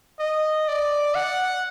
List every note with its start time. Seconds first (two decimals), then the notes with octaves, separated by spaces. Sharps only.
0.20 D#5
0.68 D5
1.15 F#5